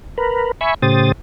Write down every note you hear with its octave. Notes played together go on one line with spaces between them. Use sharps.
A#4 B4
E5 G#5 B5 C#6
A2 C#3 G4 C5 D#6 A6